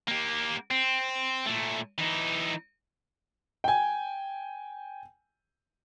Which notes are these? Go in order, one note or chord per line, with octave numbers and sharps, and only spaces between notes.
A#3 G4
C4
A#2 A3
E3 D#4
G5 G#5